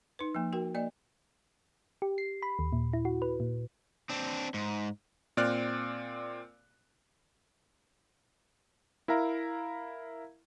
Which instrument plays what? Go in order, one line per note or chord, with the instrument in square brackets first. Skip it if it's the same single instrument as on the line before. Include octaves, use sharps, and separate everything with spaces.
[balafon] D#4 B4
F3 A#3
F#4 A#4 G5
A#3 D5 D#5
[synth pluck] G4
C7
B5
D#2
A#2
E4
F#4
B4
A#2
[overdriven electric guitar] C4 D4
G#2
[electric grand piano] A#2 C4 D5 F6 F#6
E4 A#4 E5 F5 A#5